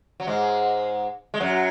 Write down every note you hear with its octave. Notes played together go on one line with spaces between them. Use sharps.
F#3
G#2 G#3
G#3
F#2 F#3